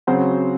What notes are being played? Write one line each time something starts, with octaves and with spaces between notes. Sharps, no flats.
C#3 F#3 C4 F#4 C5